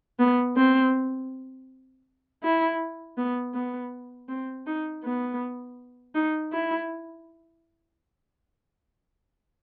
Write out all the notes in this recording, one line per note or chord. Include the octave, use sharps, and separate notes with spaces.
B3
C4
E4
B3
B3
C4
D#4
B3
D#4
E4